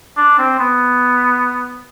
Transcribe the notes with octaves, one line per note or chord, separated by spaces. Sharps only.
D4
C4
B3